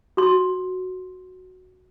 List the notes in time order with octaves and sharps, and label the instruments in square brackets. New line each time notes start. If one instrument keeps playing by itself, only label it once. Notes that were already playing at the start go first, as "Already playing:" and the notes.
[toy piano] F#4 C6